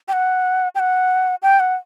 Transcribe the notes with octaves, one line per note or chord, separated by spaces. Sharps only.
G5
F#5
G5
F#5
G5
F#5